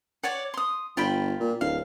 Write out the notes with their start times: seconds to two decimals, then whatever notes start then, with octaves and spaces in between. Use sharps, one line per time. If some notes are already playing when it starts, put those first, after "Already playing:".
0.23 C#5 D5 F#5
0.54 C6 D#6
0.97 G1 F4 G5 B5
1.39 A#2
1.61 D1 F5